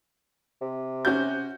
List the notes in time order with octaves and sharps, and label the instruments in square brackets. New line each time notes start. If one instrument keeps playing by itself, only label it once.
[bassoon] C3
[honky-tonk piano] C#4 F#4 G6